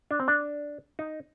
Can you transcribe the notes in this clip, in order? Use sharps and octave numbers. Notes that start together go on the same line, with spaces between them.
D4
C4
D4
D#4